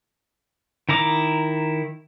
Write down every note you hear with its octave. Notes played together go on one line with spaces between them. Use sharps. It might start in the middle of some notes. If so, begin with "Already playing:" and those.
D#3 E4 A#5 D6